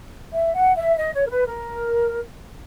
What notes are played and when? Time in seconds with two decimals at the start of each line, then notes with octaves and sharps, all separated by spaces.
0.32 E5
0.54 F#5
0.76 E5
0.97 D#5
1.13 C#5
1.25 A#4
1.30 B4
1.46 A#4